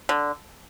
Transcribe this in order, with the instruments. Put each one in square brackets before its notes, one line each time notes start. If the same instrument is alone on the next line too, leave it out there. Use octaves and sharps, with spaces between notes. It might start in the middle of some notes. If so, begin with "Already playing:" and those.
[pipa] D3